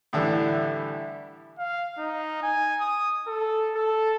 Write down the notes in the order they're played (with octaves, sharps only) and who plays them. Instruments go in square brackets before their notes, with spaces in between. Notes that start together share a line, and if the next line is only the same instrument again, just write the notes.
[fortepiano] A2 D3 E3 G3
[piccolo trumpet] F5
D#4
G#5
D#6
A4
A4